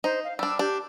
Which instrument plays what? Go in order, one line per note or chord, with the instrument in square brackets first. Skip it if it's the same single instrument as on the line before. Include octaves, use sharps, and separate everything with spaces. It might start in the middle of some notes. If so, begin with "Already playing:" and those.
[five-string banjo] D#4 [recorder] C5
[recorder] F5
[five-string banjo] G3 D4 [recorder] E6
[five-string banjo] D4 [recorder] G4